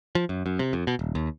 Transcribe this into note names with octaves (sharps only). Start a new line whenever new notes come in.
F3
F#2
F#2
C3
F2
B2
D#1
D#2